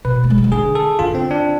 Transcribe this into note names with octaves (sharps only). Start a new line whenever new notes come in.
B2 B4
A3
G#3
F3
E3
D3 G#4
A4
D3 F4
C4
D4